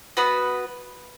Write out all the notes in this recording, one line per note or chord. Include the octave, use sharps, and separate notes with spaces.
B3 F#4 B4 F#5